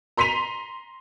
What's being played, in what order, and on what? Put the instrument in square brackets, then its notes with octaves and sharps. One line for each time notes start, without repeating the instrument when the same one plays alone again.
[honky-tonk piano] A#5 C6 B6 D#7 F7